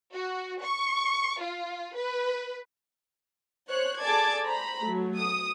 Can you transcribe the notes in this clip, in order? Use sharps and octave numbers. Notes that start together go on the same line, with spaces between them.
F#4
C#6
F4
B4
C5 C#5 F#6
G#4 A4 D5 A5 D6 G#6
C5 A#5 B5
F#3 A3
D#6